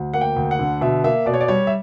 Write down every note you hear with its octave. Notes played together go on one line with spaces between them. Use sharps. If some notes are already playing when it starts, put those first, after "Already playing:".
Already playing: D2
A#3 F#5
G5
D2
F#5
D3
B2 E5
A#3 E5
B2 D5
C#5
D5
G3 C#5
E5